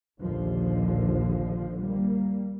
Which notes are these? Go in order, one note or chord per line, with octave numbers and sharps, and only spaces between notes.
A#1 D#2 D3 F3
G3 A#3